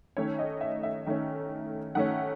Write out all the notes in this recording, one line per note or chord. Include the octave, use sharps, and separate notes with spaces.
D#3 A3 C#4 C#5
D#5
E5
E5
D#3 A3 C#4
D#3 A3 C#4 F#5